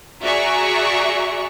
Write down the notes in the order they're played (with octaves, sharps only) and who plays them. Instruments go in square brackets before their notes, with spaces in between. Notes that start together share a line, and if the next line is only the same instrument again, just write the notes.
[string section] F#4 G#4 D5 E5 A#5 C#6